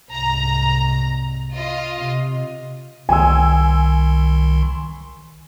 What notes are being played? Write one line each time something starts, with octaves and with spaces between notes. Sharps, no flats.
C2 G#2 A#5
F4 D#5
C3
C2 D#3 G#5 C6 E6